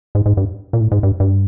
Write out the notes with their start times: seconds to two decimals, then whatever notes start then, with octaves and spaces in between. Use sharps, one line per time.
0.15 G#2
0.26 G#2
0.37 G2
0.73 A#2
0.81 A2
0.92 G#2
1.03 G2
1.20 G2